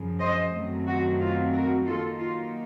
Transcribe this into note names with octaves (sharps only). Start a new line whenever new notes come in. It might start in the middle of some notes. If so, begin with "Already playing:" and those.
Already playing: F#2 C#3 F3
C5 D#5
F#2 D#3 F#3 A3 C4
F#4
F4
F#4 A#4
D#3 F#3 A#3 D#4 F4 A4
F4